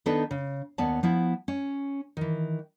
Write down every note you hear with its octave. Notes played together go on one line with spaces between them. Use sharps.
D#3 B3 D4 D#4 A4 B4
C#3
D#2 B3 C#4 D5 A5
F3 B3 E4
C#4
D#3 E3